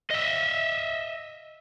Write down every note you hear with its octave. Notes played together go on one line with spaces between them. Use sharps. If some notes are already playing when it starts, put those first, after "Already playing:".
D#5 E5